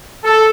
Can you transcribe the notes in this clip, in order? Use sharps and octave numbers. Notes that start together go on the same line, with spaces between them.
A4